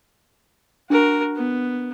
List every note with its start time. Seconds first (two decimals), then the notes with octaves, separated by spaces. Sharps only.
0.90 D4 F#4 A#4
1.36 B3